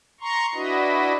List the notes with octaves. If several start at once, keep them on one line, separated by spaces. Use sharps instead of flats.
A#5 C6 C#6
D4 E4 F#4 B4 D#5